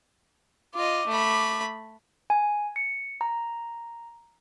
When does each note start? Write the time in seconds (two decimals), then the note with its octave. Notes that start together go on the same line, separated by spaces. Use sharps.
0.75 F4 D#5 D6
1.07 A3 B5
2.30 G#5
2.76 C#7
3.21 A#5